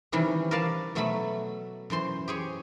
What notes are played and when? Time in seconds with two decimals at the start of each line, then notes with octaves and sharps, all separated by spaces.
0.12 C3 D#3 E3 G3 C#4
0.51 A#4 B4 D5 F5 A5
0.95 B2 F#3 A3 E5 B5
1.90 F#2 E3 C5 C6
2.28 G4 G#4 C#5